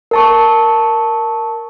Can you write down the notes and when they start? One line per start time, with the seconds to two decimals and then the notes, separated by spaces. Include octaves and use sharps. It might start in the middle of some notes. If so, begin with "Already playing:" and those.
0.11 A#4 A5 C#6